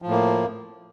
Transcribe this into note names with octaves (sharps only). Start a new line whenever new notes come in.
A2 F3 A#3